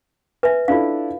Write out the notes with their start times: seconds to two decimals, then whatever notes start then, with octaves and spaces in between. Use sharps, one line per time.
0.43 B4 E5 G#5
0.68 D4 E4 F4 A4 F5